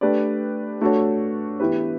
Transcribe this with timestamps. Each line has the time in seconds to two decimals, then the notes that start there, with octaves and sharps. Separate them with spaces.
0.01 A3 D4 G4 B4 D5
0.81 A3 D4 F#4 A4 C#5
1.60 E3 B3 E4 G4 B4